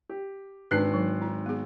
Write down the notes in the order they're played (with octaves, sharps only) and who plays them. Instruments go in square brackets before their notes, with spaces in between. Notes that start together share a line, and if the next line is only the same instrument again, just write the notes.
[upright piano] G4
[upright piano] G#1 F#6 C7 [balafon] D4 D#4 B4
[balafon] F#3
E4
B3 G#4